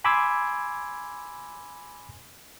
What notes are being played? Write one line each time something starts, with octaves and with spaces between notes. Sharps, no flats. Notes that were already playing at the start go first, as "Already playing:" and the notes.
G#5 B5 C6 D6 E6 G#6